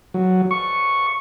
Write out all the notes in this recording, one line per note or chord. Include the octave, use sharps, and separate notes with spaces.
F#3
C#6